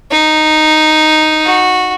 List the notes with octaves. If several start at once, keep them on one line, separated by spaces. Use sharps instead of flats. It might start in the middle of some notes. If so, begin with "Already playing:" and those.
D#4
F#4